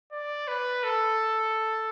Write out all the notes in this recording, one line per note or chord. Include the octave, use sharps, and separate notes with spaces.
D5
B4
A4